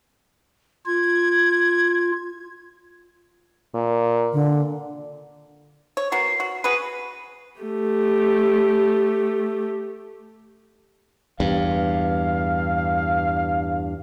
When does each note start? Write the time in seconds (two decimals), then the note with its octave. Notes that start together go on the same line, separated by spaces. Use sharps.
0.86 F4 G#6
3.74 A#2
4.33 D3
5.97 C#5
6.12 B3 F#4 A#4 C7
6.40 F#4
6.64 F#4 G#4 B4 D#7
7.61 A3 G4
11.40 E2 G2 F5